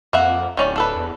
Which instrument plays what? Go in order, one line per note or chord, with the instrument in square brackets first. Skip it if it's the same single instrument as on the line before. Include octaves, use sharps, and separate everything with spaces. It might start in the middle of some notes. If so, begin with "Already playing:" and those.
[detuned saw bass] F2 [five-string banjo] A#3 E5 F#5
[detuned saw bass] D1 [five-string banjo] D#3 C#4 D5
[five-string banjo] D4 A4 B4
[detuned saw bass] E2